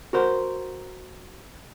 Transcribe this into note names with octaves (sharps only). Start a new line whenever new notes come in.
F#4 A#4 C5